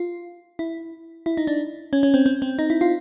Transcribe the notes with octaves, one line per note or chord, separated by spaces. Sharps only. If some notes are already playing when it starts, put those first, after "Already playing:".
Already playing: F4
E4
E4
D#4
D4
C#4
C#4
C4
C4
C4
D#4
E4
F4